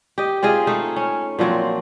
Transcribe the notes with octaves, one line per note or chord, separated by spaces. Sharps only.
G4 D#5
C4 F4 G#4 D#5
A3 D#4
C#4
A#2 F3 F#3 C4